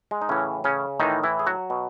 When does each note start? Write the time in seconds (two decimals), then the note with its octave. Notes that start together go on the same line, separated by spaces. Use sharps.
0.11 G#3
0.22 D#4
0.29 A2 C#3 E3 C#4
0.64 C#3 C#4
1.00 A2 D#3 E3 D#4
1.23 E3 E4
1.39 G#4
1.47 F#3 F#4
1.70 B2